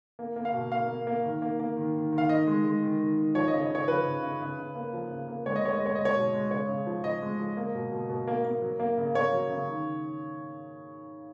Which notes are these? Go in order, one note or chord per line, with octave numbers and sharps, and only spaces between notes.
A#3
A#3
F5
B2
A#3 F5
A#3
A#3
D#3
A#3
A#3
D#3
D#3
D#3
F5
D#3 D#5
G#3
G#3
D#3
D#3
D#3
F3 C#5
D#5
C#3
D#5
C#3 C#5
F3 B4
C#3
C#3
C#3
C#3
A#3
F3
C#3
A#3
G#3 C#5
D#5
G#3 C#5
D#5
G#3 C#5
G#3 D#5
C#5
B2
G#3
C#3 C#5
C#3
F3
F3 D#5
G#3
F3
A#3
B2
B2
B2
A#3
A#3
F#3
A#3
C#3
A#3 C#5
F#3
C#3
D#3